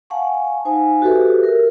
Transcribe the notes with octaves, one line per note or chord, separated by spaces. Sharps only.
F5 F#5 G#5 A5 C#6
D#4 C5 F5 G#5
F#4 G4 A4 B4 C5 E5
A#4